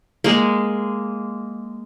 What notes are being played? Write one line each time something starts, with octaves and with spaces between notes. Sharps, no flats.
G#3 A#3